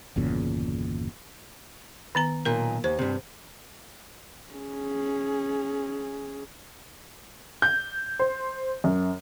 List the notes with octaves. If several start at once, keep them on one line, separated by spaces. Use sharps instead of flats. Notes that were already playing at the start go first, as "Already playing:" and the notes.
G1 E2 A#2 C#3
D#3 B3 A#5
B1 A#2 A#4
D#2 C5
G2 C3
C#4 G#4
G6
C5
F#2